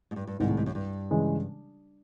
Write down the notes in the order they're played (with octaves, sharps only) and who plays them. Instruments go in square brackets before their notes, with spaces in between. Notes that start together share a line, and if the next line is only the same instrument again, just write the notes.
[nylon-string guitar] G#2
G2
G2
[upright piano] C2 C3 D#3 G#3 [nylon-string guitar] G#2
[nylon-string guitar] A2
G#2
F#2
G2
[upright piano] C#3 E3 G#3